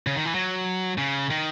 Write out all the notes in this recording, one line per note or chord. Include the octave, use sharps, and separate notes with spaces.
C#3
D#3
E3
F#3
C#3
D#3